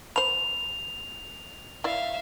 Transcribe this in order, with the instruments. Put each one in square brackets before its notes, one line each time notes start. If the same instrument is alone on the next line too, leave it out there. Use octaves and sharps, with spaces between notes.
[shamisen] C5 B5 [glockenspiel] F7
[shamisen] E4 D5 [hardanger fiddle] E5 F5